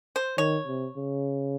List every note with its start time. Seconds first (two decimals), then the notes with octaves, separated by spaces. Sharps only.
0.16 C5
0.38 D#3 C#5
0.67 C3
0.97 C#3